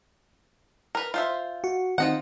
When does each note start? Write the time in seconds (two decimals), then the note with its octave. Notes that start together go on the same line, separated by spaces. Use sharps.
0.95 A#4 B4
1.14 F4 C5 E5
1.64 F#4
1.98 D#3 C4 D#4 F4 D#5 F#5